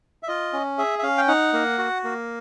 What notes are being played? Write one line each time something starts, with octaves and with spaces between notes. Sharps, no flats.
E5
F4 D#5
C#4
G#4 E5
E5
C#4 F5
G5
D#4 F#5
A#3
F#4
A#3